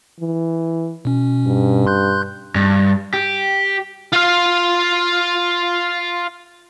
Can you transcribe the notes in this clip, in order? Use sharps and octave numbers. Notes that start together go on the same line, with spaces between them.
E3
B2 C#4
G2
C6 F#6 G6
G2
G4
F4 F5